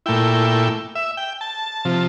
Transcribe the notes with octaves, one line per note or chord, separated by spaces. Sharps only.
A#2 A3 E4 G5
E5
G5
A5
C3 F3